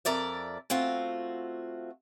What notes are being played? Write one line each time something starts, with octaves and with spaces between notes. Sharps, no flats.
F2 A#4 D5 E5
A3 C4 F4 F#4